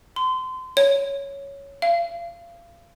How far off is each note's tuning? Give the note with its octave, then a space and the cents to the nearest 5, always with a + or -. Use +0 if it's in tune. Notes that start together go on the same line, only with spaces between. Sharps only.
C6 -30
C#5 +5
F5 -30